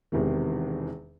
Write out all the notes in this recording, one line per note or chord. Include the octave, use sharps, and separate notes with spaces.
E1 E2 C3 D#3